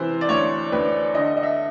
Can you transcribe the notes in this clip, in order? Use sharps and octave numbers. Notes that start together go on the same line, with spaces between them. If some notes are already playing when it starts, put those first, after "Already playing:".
Already playing: C3 E3 C5
D5
D2 C#5
D2 B4
D3 D#5
D#5
E5